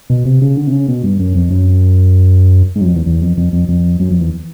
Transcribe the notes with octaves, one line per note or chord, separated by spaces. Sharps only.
B2
C3
C#3
D3
C3
C#3
B2
G2
F#2
F2
F#2
G#2
F#2
F2
E2
E2
F2
F2
F2
F2
F#2
F2
E2